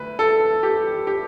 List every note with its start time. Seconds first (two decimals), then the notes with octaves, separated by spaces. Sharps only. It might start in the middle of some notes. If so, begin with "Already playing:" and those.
Already playing: D2 B4
0.19 A4
0.63 G4
1.07 G4